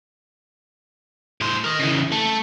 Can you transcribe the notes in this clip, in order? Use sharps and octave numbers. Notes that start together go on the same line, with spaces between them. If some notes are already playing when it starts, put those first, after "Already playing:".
A2 C5
A#4 D#5
C#3 E3
A3